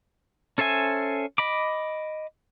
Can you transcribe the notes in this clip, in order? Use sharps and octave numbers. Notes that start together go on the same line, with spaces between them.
C#4 A4 C5 E5 G#5
D#5 B5 D6